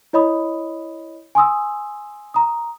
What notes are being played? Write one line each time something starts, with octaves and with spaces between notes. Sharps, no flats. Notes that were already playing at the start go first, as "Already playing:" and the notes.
E4 C#5 D#5 B5 D#6
G#5 C6 D#6 E6
A#5 D#6